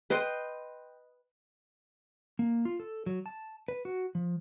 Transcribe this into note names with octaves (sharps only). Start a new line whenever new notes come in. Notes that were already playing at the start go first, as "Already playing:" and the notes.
B4 D#5 G5 C6
A#3
F4
A4
F#3
A5
B4
F#4
F3